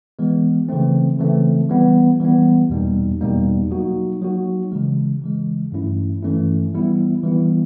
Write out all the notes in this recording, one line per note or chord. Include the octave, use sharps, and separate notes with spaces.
E3 G#3 B3
C#3 E3 A3 C4
C#3 E3 A3 C4
E3 G3 B3
E3 G3 B3
E2 B2 G3 A#3 D#4
E2 B2 G3 A#3 D#4
F#3 A#3 D#4 F#4
F#3 A#3 D#4 F#4
C#3 E3 G#3
C#3 E3 G#3
G2 E3 A3 C#4 E4
G2 E3 A3 C#4 E4
E3 G3 B3 E4
E3 G3 B3 E4